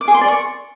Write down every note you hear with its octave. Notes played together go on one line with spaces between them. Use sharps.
D6
G#4
C6
D5
C#6